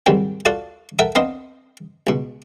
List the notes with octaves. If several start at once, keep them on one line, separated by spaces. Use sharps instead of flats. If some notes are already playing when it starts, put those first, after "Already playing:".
G#2 D#3 F#3 G3 C4
F4 F#4 A4 D5 F5 F#5
A4 A#4 E5 F#5 G5
B3 C4 D4 C5 D#5 F5
C#2 B2